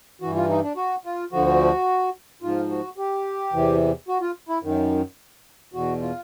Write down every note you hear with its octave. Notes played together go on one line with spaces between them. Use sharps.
G2 E3 F#4
F4
D#4
D4
F#4
F4
D2 D3 F3 F#4
G#2 F3 F4
F#4
G4
E2 C3 E3
F#4
F4
E4
F#2 D#3
E2 B2 F#4
F4